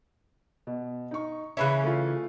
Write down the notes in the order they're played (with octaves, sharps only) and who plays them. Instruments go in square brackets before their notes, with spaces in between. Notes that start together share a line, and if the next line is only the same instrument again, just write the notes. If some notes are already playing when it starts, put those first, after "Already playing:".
[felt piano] B2
D#4 C#6
[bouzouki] C#3 E3 C#4 [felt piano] E5 B5 F#6
[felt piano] A3 F4